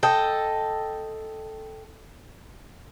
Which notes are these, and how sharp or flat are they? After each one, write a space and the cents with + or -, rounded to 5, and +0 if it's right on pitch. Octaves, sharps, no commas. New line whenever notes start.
A4 +0 D#5 +0 G5 +0